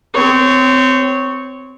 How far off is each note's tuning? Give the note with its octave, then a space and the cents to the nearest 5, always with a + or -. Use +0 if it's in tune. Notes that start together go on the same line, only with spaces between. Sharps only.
C4 -20 C#5 +0